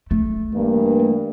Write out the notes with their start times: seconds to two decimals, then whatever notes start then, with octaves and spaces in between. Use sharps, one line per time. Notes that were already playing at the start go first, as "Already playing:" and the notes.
0.11 A3
0.53 G2 E3 A#3